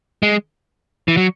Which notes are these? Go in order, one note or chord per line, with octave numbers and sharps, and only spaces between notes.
G#3
E3
F#3